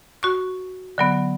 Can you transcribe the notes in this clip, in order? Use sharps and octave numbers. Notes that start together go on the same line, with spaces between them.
F#4 C#6
D3 F#3 B3